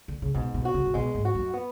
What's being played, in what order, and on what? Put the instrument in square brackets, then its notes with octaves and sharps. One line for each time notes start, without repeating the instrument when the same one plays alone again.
[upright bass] D3
C#3
[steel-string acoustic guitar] G#2 [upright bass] B2
[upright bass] B2
[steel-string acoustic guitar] F#4
[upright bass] C#3
C#3
[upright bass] B2 [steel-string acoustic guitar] G#3
[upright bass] G#2
[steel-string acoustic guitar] F#4
[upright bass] F#2
[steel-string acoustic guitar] B3